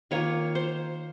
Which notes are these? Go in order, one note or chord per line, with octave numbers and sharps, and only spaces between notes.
D#3 A#3 F4 C#5
C5